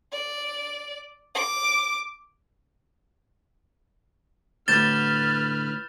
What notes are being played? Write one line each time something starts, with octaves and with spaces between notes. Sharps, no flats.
D5
D6
D2 A2 B4 F6 G6 A6 E7 G7